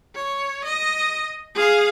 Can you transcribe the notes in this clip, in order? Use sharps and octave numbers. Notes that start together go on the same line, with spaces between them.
C#5
D#5
G#4 F5